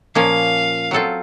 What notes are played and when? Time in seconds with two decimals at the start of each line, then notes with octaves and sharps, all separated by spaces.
0.15 A#2 F3 A#3 C#4 F5
0.91 F#3 C4 F4 A4